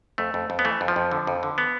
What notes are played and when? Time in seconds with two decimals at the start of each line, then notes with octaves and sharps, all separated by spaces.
0.18 F2 A3
0.34 F2
0.50 F2
0.59 B3
0.65 E3 A3
0.81 F2
0.88 F3
0.96 F2
1.11 D3
1.27 F2
1.43 D3
1.58 B3